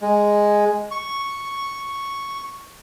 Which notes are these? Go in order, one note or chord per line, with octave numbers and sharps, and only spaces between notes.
G#3
C#6